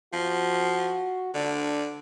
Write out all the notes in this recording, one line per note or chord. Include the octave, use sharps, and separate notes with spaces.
F3 F#4
D3 D4